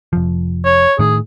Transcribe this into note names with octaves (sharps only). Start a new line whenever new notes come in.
F1 F3
C#5
A2 D#3 G#4